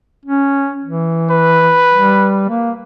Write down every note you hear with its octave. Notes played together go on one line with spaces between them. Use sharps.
C#4
E3
B4
G3
A#3